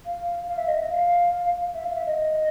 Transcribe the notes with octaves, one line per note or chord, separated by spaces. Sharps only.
F5
F5
E5
D#5
E5
F5
E5
F5
E5
D#5